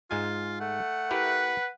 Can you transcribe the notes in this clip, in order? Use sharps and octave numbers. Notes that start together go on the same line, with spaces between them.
G#2 G#3 F4 G#5
A3 F#5
E4 G4 A#4 B4